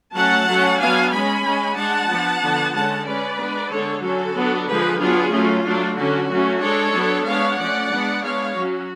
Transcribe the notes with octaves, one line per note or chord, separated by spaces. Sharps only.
F#3 A3 C#4 F#5 A5
F#3 A3 C#4
F#3 B3 D4 F5 G#5
G#3 C#4 G#5 B5
G#3 C#4
G#3 D4 F#5 A5
F3 B3 D4
D3 F3 B3 D4
D3 G#3 C#4 F#5 A5
G#3 C#4 B4 D5
G#3 B3 D4
D3 G#3 D4 A4 C#5
D3 F#3 C#4 F#4 A4
F#3 B3 D4
D3 F3 G#3 G#4 B4
F#3 B3 D4 F4 G#4
F#3 A3 C#4 F4
F#3 A3 D4
D3 F#3 C#4 F#4
F#3 A3 C#4
G#3 D4 A4 C#5
F#3 B3 D4
G#3 B3 D4 C#5 F5
F3 A3 C#4 D5 F#5
G#3 B3 D4
G#3 B3 D4 C#5 F5
F#3 C#4 F#4